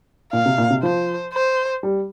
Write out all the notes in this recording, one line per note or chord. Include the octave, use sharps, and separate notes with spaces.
A#2 F5
C3
A#2
C3
F3 C5
C5
G3